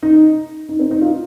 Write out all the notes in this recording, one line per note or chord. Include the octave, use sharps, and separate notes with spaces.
D#4
D#4
C4
D#4
F4